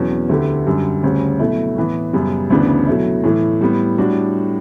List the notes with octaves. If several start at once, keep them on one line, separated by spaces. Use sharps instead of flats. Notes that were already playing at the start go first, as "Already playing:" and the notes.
Already playing: E2 B2 F#3 C#4
D2 D3 A3 E4 G4
F#2 D3 G3
D2 C#3 G3 C#4
B2 F#3 A3 E4
A2 E3 B3
F#2 C#3 G3 B3
D2 C#3 E3 B3 D4
B2 F#3 A3 E4
A2 E3 A3
A2 G3 B3
A2 G3 D4 F#4